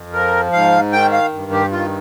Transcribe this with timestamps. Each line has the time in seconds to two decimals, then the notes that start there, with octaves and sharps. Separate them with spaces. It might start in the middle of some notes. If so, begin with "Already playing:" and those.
Already playing: F2
0.13 F3 A#4
0.53 G#2 F5
0.93 D#3 G5
1.13 F5
1.33 G2
1.52 G4
1.72 D#3 F4